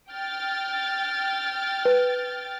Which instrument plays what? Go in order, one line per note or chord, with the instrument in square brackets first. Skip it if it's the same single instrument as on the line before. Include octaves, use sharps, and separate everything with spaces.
[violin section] G5 F6 A6
[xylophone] B4